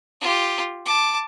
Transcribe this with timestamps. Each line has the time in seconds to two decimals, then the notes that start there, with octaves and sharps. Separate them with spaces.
0.21 F4 G4
0.85 A5 D6